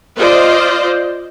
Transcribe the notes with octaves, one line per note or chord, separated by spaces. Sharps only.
F4 C5 D5 D#5